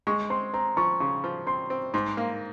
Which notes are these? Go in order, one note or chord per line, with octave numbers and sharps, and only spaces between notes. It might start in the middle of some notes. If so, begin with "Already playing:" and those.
G#3 C#6
C4 C6
C4 A#5
F3 C#6
C#3 C#6
F3
C4 C6
C4
G#2 C6
A#3